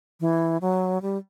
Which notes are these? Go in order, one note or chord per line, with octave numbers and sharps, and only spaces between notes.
E3
F#3
G3